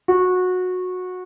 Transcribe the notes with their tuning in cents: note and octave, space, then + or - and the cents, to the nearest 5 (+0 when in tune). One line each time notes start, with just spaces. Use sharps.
F#4 -20